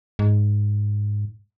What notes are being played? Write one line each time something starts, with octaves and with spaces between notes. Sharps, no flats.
G#2